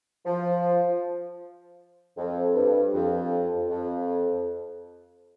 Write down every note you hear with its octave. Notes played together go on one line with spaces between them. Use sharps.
F3
F2
G2
F2
F2